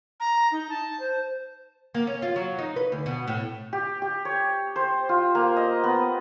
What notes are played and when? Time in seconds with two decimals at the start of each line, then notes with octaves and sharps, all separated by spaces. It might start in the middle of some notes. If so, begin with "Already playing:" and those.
0.20 A#5
0.52 D#4
0.70 A5
1.00 C5
1.95 A#3
2.07 C#4
2.22 F4
2.36 F#3
2.58 D#4
2.76 B4
2.92 D2
3.06 B2
3.27 A2
3.73 G4
4.02 G4
4.25 C#5
4.76 C5
5.09 F4
5.35 A#3
5.57 D#5
5.84 B3